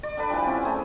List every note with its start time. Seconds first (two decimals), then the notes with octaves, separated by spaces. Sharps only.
0.03 D5
0.17 D3 D4 B4 B5
0.30 D3 E3 F3 G3
0.46 C4 C#4 E4 E5
0.63 A3 G#4 C5